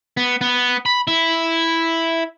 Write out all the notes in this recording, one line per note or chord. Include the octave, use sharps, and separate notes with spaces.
B3
B3
B5
E4